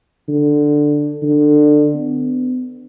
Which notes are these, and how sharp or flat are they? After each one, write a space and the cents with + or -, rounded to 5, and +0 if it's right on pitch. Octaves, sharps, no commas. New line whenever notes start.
D3 +5
D3 +20
B3 +40